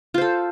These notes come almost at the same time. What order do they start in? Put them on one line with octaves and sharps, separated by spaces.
F4 C5 A4